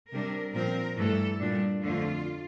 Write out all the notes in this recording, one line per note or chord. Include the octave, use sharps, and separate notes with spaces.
C3 G3 D4 A#4
A#2 F3 C4 A#4
G2 E3 A3 A4
A#2 G3 D4
F2 D3 A3 D4 F4